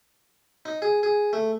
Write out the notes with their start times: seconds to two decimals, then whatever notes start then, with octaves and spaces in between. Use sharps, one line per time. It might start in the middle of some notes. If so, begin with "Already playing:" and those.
0.65 D#4
0.82 G#4
1.03 G#4
1.33 A3